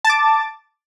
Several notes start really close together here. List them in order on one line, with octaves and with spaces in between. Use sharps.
A5 A6 D6